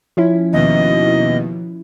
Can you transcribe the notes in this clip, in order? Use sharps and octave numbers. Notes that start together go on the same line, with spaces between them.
F3 C#4 E4
D#2 B2 D#5